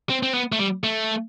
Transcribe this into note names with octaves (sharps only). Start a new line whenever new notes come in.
C4
C4
B3
A3
G3
A3